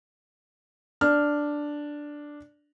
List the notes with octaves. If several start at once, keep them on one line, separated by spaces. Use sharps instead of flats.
D4 F6